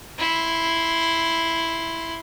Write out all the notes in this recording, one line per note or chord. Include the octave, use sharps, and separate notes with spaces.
E4 C6